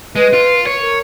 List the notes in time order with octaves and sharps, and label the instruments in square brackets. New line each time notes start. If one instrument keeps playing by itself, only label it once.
[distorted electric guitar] G#3 [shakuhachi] B4
[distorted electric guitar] F4
C#5
[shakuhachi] A#4